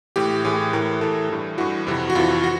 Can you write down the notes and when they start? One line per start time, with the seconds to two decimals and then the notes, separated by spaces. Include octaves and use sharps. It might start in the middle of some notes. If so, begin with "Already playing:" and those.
0.16 A2 E3 G4
0.45 A2 E3 G#4
0.73 A2 E3 A#4
1.01 A2 E3 A4
1.30 G2 E3
1.58 G2 E3 F#4
1.87 F2 C3 E3
2.10 F#4
2.15 F2 C3 E3 F4
2.44 F#4